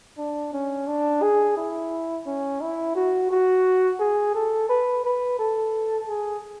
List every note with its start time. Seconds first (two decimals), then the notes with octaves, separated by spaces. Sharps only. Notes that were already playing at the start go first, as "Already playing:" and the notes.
0.18 D4
0.53 C#4
0.87 D4
1.22 G#4
1.57 E4
2.26 C#4
2.61 E4
2.95 F#4
3.30 F#4
4.00 G#4
4.35 A4
4.69 B4
5.04 B4
5.39 A4
6.08 G#4